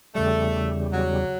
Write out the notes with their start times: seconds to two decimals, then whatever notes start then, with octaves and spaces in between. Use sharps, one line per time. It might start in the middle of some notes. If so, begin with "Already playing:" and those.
0.15 E2 C#3 G3 A3
0.93 F#3